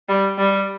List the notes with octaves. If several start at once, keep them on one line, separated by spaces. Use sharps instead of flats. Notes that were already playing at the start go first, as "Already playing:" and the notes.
G3
G3